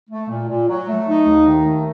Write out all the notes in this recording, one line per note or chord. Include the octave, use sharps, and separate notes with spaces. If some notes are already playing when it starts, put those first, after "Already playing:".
A3
A#2
A#2
F#3
A3
D#4
D#2
D#3
A3